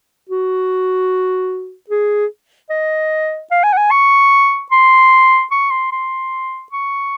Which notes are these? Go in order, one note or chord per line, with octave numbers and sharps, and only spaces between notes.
F#4
G#4
D#5
F5
G#5
F#5
G#5
C#6
C6
C#6
C6
C6
C#6